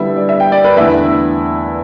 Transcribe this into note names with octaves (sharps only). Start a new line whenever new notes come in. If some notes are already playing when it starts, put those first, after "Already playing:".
Already playing: D3 G3 B3 E4 E5
D5
E5
G5
D5
B4
E2 D3 A3 E4 E5